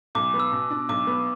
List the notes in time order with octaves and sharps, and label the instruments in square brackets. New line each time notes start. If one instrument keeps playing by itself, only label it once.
[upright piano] B1 [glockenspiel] D6
[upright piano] B3
[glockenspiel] E6
[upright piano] B2
D4
[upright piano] B1 [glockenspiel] D6
[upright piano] B3